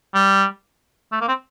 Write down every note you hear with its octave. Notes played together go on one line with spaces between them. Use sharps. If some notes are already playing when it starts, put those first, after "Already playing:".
G3
A3
A#3
C4